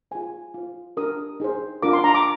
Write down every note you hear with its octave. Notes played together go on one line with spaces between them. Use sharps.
F4 G#4 C5 G#5
F4 C5
D4 G4 A#4 D#6
D#4 G#4 C5
D4 F4 A#4 D6
C6
A#5
D6